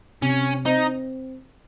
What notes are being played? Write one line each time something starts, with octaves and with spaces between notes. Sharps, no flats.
C3 C#4
C4 D#4